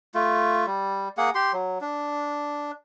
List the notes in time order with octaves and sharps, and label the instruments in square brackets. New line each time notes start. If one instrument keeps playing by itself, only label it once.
[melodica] A3 F4
G3
A#3 G#4 F#5
G4 C6
F#3
D4